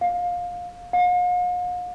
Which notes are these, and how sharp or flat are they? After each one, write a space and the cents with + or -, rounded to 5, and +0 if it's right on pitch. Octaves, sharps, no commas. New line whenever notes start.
F5 +20
F5 +45